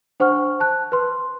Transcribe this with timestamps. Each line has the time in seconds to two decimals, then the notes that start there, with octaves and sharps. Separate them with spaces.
0.20 D4 C5 F#5 C#6 F6
0.60 A5 F#6
0.92 B4 C6